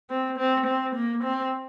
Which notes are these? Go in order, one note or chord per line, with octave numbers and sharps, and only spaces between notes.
C4
C4
C4
A#3
C4